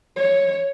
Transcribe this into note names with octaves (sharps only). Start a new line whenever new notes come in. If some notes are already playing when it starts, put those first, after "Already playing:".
C#5